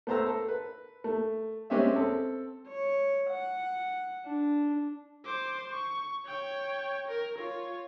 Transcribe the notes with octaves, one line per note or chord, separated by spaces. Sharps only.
A3 B3 C5 A5 A#5 E6
A4
B4
A3
G#3 C4 C#4 G4 C#5 E5
C4 A4
C#5
F#5
D4
C5 D6
C#6
C#5 G5
A#4
F4 C#5